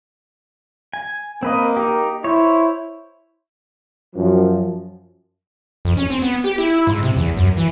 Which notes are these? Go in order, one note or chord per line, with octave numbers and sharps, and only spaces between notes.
G#5
A#3 C4 B4 D#5
D#4 G4
E4 C5 C#5
F#2 F3
F2
C#4
C4
B3
G4
E4
G#2
C3
E2
F#2
E3